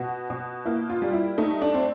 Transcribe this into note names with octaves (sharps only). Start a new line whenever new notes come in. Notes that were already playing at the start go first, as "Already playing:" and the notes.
Already playing: B2 F#4
B2
A#3 E4
F4
G3
E4
A3 D#4
D4
C4